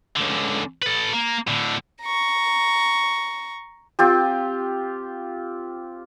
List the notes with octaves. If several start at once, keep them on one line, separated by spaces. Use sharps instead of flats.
C#2 D3
A4 B4
A#3
A2 D3
A#5 C#6
C4 F4 G4